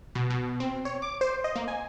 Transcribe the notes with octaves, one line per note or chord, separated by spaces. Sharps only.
B2
B2
C4
C#5
D6
C5
D#5
A#3
G#5